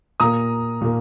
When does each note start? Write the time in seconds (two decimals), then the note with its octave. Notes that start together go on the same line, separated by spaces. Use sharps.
0.20 A#2 A#3 A#5 D#6
0.82 A#2 A#3